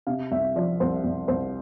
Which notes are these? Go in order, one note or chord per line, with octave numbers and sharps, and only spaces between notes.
C3 F5
C2 E5
F3 D5
C2 C5
C2
C2 C5